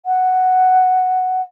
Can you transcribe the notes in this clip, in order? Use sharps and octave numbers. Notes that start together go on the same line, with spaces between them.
F#5